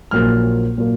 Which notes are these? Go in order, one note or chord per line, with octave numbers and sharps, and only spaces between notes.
A#1 A#2 F#3 A#3 F6
A#2 F#3 A#3